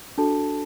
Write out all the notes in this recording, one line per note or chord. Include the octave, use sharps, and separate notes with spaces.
D4 F#4 A4 A5